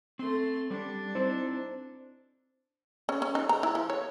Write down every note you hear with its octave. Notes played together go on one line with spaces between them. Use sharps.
A3 C4 C6
G3 D4
C4 D#4 E4 C5
C#4
C#4
D#4
A#5
E4
F3
C#5